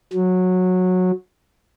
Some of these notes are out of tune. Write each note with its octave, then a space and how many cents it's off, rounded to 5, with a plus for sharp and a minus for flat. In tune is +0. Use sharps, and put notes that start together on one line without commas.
F#3 -15